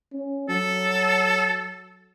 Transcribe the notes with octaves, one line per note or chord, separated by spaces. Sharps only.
C#4
F#3 A4